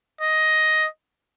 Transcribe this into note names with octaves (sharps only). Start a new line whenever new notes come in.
D#5